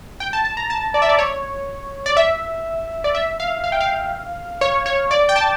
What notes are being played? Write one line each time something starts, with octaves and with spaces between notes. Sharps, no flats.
G5
A5
A5
A#5
A5
D5
E5
D5
C#5
D5
E5
D5
E5
F5
F5
G5
F5
C#5
C#5
D5
G5
A5